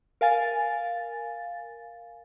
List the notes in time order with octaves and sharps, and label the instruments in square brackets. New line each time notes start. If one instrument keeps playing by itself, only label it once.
[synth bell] A#4 F5 G#5 A6